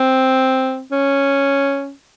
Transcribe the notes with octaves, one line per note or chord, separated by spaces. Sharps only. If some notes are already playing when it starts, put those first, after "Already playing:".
Already playing: C4
C#4